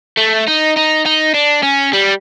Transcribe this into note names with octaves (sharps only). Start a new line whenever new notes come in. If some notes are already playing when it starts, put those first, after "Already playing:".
A3
D#4
D#4
D#4
D4
C#4
G3